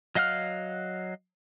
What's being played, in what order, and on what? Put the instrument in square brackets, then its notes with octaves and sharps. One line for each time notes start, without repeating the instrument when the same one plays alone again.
[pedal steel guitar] F#3 D#5 F5 F#5 F6